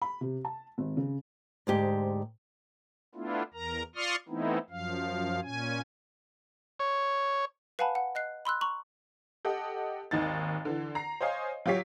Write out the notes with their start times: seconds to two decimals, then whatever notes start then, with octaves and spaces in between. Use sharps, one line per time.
0.02 B5
0.21 C3
0.45 A5
0.78 G#1
0.97 C#3
1.67 D2 G#2 G4 C5
3.15 A3 B3 D4 E4 F4
3.54 E2 A#4 A#5
3.95 F4 D5 C6 C#6 D#6 F6
4.29 E3 A3 B3 C4 D#4 E4
4.70 F#2 F3 F5
5.43 A#2 C#4 G#5
6.80 C#5
7.79 B4 F5 F#5 G#5 A5 B5
7.95 F#5
8.15 D#5 F#6 C7
8.45 B5 C6 E6 F#6
8.61 A#5 C#6 F#7
9.45 G4 A4 D#5 F#5
10.11 G#1 D#2 D#4 A6
10.65 D3 E3
10.95 A#5 C7
11.21 C5 C#5 D#5 F5 G#5 C7
11.66 F#3 F4 G4 C#5 B6